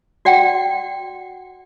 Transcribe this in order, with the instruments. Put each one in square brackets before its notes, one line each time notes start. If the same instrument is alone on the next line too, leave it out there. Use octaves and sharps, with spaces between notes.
[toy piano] F#4 D5 F#5 G5